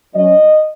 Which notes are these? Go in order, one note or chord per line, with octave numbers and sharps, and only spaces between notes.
F#3 C#4 D#5